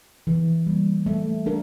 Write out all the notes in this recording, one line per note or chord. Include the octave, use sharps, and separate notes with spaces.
E3
G3 A#3
A3
D4 A#4